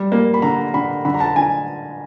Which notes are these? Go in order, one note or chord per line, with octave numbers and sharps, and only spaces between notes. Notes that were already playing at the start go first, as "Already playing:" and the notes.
Already playing: G3
A#3
B5
D3 A#5
D3 B5
D3 B5
A#5
A5
D3 G#5